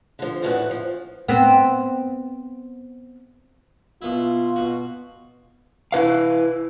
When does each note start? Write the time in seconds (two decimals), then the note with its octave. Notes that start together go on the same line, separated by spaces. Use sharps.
0.19 D3 F3
0.42 E2 A2 D#3 E3 D4 F#4
0.71 F3
1.28 B3 C4
4.02 B2 B3 E4 F4
4.56 B2 F#4
5.92 E4 B4 F5